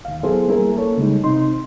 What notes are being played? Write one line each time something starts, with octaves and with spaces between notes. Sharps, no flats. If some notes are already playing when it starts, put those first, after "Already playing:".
D#2 F5
F#3 B3 E4 G#4 A4 C5
G3 A#3 C#4 E4 G#4 A#4
A#3 A4 C#5
C#3 G3 G#3 D#4
C3 C4 D#4 C6